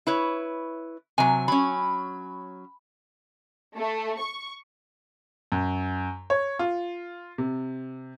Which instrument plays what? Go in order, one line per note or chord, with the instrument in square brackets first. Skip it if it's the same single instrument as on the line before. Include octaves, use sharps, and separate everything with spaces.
[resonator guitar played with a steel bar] E4 B4 C#5
[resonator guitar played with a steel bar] C3 F#3 [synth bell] G#5
[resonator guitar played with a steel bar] F#3 C#4 [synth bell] B5
[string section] A3
C#6
[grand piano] F#2
C#5
F4
C3